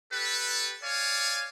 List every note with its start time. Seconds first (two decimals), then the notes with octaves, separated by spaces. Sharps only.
0.12 G4 A4 B4
0.83 C#5 D5 F5 G#5